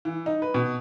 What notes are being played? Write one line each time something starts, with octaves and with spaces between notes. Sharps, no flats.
E3
D#4
B4
B2